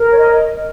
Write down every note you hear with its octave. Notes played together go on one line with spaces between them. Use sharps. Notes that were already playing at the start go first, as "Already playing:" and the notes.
Already playing: A#4
C#5
D#5